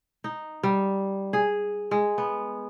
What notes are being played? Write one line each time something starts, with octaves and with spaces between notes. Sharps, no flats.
D#4
G3
G#4
G#3
B3